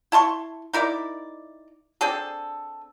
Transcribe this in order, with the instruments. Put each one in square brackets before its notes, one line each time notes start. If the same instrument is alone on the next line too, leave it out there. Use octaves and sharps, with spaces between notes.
[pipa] E4 A5 C6 C#6
D#4 E4 A#4 D5
C4 D4 G#4 A4